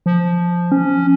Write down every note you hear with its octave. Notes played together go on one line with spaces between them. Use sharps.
F3
C#4